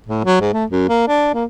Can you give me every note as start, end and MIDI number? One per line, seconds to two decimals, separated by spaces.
0.07 0.24 45
0.24 0.37 54
0.41 0.52 44
0.53 0.65 57
0.70 0.84 42
0.89 1.05 58
1.08 1.33 62
1.34 1.44 58